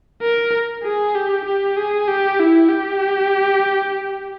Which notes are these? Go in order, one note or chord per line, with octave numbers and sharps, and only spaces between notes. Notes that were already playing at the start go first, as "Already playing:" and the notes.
A#4
G#4
G4
G4
G#4
G4
E4
G4